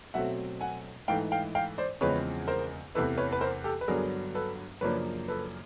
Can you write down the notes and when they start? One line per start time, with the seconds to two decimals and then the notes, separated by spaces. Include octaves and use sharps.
0.14 B2 F#3 A3 C4 E5 F#5
0.61 F#5 G#5
1.08 G#2 E3 A3 F5 G5
1.32 F5 G5
1.55 F5 G5
1.78 C5 D5
2.01 E2 C#3 F3 G#3 C4 B4 C#5
2.48 A#4 C5
2.95 E2 C3 E3 A3 A4 B4
3.18 B4 C#5
3.32 B4
3.41 A#4 C5
3.64 G4 A4
3.81 B4
3.88 G2 D3 F#3 B3 D4 G#4 A#4
4.35 A4 B4
4.81 F#2 C#3 F3 A#3 D4 B4 C#5
5.28 A4 B4